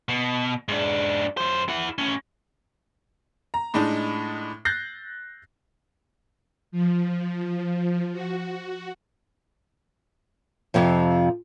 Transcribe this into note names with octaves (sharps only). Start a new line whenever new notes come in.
B2
G#2 D4
F#2 C5
E4 F#5
A2 C#4
A#5
A2 G#3 D4 D#4
F#6 G6 A6 A#6 C7
F3
F#4
F2 C3 F3